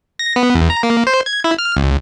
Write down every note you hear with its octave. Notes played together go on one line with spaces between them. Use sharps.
A#6
B3
E2
A#5
A#3
C5
G#6
E4
F6
C#2